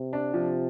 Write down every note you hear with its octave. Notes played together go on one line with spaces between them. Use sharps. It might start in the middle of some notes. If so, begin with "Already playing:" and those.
Already playing: C3
D4
C3 F3